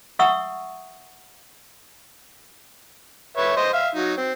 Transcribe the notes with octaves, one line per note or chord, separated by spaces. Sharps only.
E5 F#5 C#6 D#6 E6
B4 C#5 E5
C5 D#5
E5 F5
F#3 D#4
C4